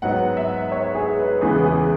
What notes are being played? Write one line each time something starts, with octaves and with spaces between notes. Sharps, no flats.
G#2 F#3 B3 F#5
E5
C#5
G#4
B4
E2 C#3 E3 G#3 B3 G#4
G#4